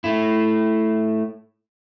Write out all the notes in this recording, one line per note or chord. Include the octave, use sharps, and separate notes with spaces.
A3 E4